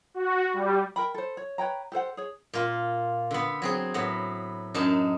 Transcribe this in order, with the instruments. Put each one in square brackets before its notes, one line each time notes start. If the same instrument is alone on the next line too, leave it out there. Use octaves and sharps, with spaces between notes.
[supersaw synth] F#4
G3
[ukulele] A#4 G5 B5
A4 C5
C#5
B4 C#5 G5 A#5
G4 A4 C5 F#5
G#4 C#5
[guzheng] A#2 F4
D3 B3
F#3 C4 G#4
A2 F#3 B3
F#2 D4 D#4 A5